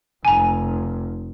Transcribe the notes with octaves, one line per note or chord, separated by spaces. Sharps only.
F1 G#5 A#5